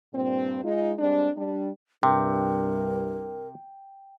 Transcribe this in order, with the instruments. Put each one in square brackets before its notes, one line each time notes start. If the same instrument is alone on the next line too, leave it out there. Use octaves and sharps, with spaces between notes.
[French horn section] G2 A#2 C4
G#3 D#4 F4
G3 G#3 C4 D4
G3 D4
[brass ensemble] C2 G2 [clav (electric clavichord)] C3 [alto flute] A#4 [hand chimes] G5